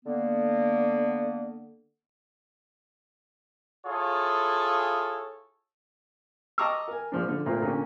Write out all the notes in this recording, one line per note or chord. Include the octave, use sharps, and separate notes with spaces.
D3 A#3 B3
E4 F4 G#4 A4 C#5
D#5 A5 A#5 C#6 D6 E6
A#4 G#5
A#1 F3 D4
D3 F3
A#2 A3 C4 F4
A#2 D3 C#4 G4